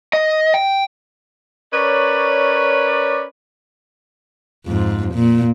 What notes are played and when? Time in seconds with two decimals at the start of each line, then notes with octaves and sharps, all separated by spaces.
0.13 D#5
0.54 G5
1.73 C#4 A#4 B4 C#5 D5
4.66 F2 G#2
5.14 A#2